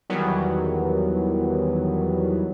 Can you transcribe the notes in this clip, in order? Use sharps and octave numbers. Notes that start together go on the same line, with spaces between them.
E2 D#3 E3 F#3 G3 B3